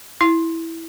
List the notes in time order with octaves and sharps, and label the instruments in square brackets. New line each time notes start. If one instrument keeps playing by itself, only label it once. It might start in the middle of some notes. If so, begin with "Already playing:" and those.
[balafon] E4